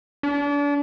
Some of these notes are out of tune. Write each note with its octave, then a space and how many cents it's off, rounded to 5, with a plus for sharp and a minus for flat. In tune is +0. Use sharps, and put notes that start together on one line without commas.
D4 -35